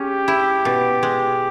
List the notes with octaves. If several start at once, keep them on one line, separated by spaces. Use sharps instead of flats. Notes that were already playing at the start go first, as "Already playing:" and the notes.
Already playing: G#3 C#4 G4
E4
B2
G#3